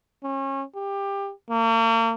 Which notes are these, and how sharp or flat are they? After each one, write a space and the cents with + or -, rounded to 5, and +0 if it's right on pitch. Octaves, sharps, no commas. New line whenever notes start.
C#4 -30
G4 +20
A#3 -40